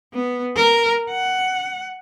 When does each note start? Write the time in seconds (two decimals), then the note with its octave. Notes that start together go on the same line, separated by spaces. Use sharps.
0.13 B3
0.56 A#4
1.10 F#5